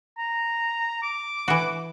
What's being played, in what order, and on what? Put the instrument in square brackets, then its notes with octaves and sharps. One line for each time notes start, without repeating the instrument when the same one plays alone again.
[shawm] A#5
D6
[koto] E3 F#4